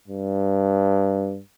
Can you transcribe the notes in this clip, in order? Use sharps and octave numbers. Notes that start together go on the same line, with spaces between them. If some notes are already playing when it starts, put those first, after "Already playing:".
G2